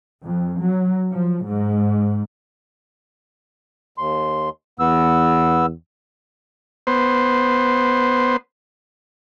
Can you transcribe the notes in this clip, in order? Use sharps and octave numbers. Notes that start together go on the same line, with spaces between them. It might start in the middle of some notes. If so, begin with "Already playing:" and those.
F2
F#3
F3
G#2
D#2 C6
E2 B3 E6
B3 C5